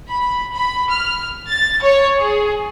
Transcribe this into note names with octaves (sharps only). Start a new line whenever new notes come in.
B5
B5
F6
A6
C#5
G#4